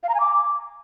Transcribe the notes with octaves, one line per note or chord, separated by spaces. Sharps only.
F5
A#5
G#5
D6